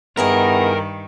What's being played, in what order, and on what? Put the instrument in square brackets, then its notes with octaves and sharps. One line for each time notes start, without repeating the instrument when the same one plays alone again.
[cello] G2 D#3 [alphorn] B3 [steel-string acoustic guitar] E4 G#4 D#5 [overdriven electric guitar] A#4